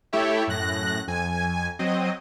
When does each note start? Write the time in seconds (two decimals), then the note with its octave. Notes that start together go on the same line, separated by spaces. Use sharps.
0.13 A3 E4 G4 C#5 E5
0.47 F#2 A2 F#6 A#6
1.07 F2 G#5
1.79 F#3 C4 D#5